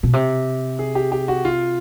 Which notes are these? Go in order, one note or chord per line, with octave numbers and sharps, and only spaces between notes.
B2
C3
G#4
G4
G4
F#4
F4